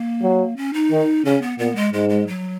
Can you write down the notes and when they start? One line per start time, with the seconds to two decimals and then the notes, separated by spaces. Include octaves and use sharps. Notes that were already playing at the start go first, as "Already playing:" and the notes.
Already playing: A#3
0.23 F#3
0.57 C#4
0.74 D#4
0.91 D#3
1.25 C#3 C#4
1.42 B3
1.59 A#2 B3
1.76 G#3
1.93 G#2 G#3
2.10 G#3
2.27 F#3